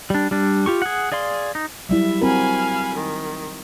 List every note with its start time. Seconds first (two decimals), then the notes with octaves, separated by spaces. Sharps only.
0.10 G3 D4
0.31 G3 D4
0.66 F4 G4 C#6
0.82 G#4 F#5
1.12 G#4 D5 F5 C6
1.55 D#4
1.89 F#3 G3 E4 E5
2.21 C4 F#4 A#4 F5 G#5 B5
2.94 D#3